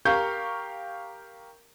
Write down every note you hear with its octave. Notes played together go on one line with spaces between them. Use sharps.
G4 A#4 F5 A#5 C#6 G6